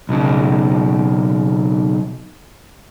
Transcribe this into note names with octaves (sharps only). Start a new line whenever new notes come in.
B1 C#3